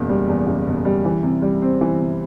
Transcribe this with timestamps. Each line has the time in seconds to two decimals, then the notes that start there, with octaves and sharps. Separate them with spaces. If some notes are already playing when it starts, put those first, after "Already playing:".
Already playing: F#1 E2 B2
0.09 G3
0.29 E2
0.47 F#1
0.67 B2
0.85 G3
1.05 E3
1.23 C3
1.42 G3
1.62 C4
1.81 E3
2.00 C3